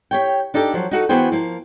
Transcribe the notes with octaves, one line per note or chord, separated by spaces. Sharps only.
G4 C#5 G5
D4 D#4 G4 A4 D5
F3 F#3
D#4 F#4 A4
E3 B3 F#4 G#4 C5 G5
F3 A#3